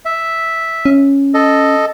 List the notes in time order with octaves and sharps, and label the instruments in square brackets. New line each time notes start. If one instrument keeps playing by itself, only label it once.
[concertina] E5
[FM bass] C#4
[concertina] A4 D#5